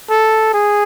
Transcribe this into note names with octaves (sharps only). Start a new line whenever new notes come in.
A4
G#4